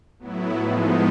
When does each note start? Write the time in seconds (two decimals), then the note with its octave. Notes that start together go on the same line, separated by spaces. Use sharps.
0.19 A2 F#3 B3 E4
0.56 A2 F3 G#3 B3 D#4